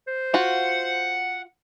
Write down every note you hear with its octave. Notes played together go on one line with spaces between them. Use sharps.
C5
F4 F#4 F#5